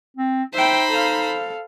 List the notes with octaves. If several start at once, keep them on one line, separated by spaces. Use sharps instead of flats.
C4
D#4 C5 E5 G5 B5
A4 F5